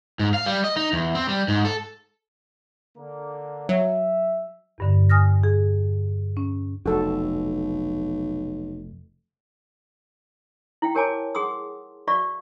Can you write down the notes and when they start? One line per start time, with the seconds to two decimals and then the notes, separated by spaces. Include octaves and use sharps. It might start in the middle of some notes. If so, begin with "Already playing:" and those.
0.19 G#2
0.34 F5
0.46 G3
0.64 D#5
0.77 D#4
0.93 E2
1.15 C4
1.29 G3
1.48 G#2
1.65 A4
2.97 D3 A#3
3.69 F#3 E5
4.78 E2 G2 D3
5.09 G#5 D#6 F6 A#6
5.44 G#4
6.37 C#4
6.86 F1 B1 F#4 A4
10.82 E4 F5 G5
10.95 G4 A#4 C#5 G#5 A5 D6
11.35 G#4 F#5 C6 D#6 E6
12.07 F#4 B4 D5 E5 F5 C#6